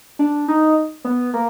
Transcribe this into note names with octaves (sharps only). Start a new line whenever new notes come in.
D4
D#4
B3
A#3